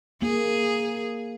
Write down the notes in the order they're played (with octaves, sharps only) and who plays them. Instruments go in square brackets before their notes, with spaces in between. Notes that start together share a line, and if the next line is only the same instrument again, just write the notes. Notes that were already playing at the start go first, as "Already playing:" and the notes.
[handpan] A#3 [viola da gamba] G#4